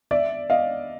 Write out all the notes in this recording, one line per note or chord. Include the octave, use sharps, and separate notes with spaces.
D5 E5
D#5 F5